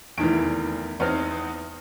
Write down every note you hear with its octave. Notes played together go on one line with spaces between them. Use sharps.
F1 E2 D#3 E3 D7
E2 B3 C4 D#4 F6